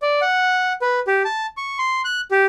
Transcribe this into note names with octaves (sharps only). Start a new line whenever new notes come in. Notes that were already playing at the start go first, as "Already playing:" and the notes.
D5
F#5
B4
G4
A5
C#6
C6
F#6
G4